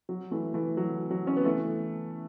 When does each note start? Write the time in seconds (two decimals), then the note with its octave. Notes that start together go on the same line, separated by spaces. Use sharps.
0.09 F#3
0.31 E3 A3
0.54 E3 A3
0.77 F#3
1.11 F#3
1.27 C#4
1.37 B3
1.45 E3 A3